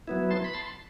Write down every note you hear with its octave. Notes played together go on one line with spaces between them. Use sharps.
F#3 B3 E4
A5 C6
B5
A5 C6